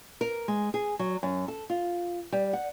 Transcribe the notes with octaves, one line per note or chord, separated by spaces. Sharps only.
A#4
G#3
G#4
F#3
F#2
A4
F4
G3
F#5